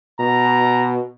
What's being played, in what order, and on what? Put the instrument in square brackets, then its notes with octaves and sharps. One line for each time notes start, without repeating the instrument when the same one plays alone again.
[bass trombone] B2 [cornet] A#5